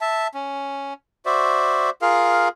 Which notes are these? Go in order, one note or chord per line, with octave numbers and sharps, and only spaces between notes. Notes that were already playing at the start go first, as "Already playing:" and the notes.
E5 A5
C#4
F#4 C5 D5 E5
F4 G#4 A#4 F5